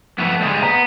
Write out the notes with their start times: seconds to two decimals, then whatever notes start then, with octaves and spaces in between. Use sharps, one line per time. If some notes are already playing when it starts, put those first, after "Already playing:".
0.18 F2 A3 B3
0.41 D2 G3 G#3
0.63 B3 B4 A#5